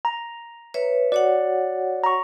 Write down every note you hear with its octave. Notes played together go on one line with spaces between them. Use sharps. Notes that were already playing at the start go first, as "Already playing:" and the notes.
A#5
B4 C#5 E5
F#4 C#5 D5 F#5
A#5 C#6